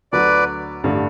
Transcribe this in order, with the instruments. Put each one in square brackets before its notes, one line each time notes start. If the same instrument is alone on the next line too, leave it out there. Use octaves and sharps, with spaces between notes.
[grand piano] D2 D3 F#3 [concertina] B4 D5
[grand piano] A1 G2 D3 A3 D4